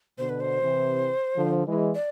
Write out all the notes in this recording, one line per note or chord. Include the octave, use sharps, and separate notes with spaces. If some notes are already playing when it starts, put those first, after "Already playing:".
B2 D3 C5
B4
C5
C3 E3
D3 F3
E3 G#3
D5